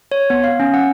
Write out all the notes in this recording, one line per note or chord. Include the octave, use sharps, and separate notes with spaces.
C#5
B3
F5
C#4
F#5